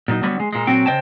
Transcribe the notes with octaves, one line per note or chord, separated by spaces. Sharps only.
A#2 F#3 D#4
D3 F#3 G3 B3
G#3
A#2 G#3
A#2 F#3 C4 G5
C#3 C5 D#5 G5 A5